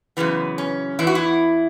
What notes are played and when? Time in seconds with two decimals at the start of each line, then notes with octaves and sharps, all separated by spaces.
0.17 F#2 C#3 E3 B3
0.58 C#4
0.99 E2 E3 E4
1.07 F#4
1.15 E4